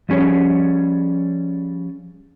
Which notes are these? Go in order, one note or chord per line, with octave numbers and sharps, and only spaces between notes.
F3 G3 C#4 G#4 C#5